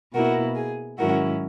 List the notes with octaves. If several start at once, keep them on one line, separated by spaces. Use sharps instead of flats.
B2 A#3 E4 F#4 A#4
G#4
G#2 D#3 F#3 C#4 E4 F#4 A#4